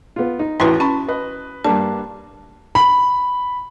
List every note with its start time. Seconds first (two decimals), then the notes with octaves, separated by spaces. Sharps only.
0.16 B3 F4
0.39 D#4
0.60 A1 E2 A2 F#4 B4 A#5 C6
0.80 C#4 A5 B5
1.08 B4 D#5
1.64 G2 A#3 D4 A5
2.75 B5